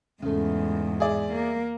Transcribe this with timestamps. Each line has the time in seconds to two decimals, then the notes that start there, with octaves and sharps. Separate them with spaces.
0.22 E2 G#2 C#3 A3
1.00 G#4 D5 E5
1.32 A#3